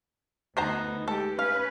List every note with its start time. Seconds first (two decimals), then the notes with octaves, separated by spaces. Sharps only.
0.57 D2 B3 D#4 C5 A#5
1.08 G#3 G4 A4
1.39 C#4 B4 F5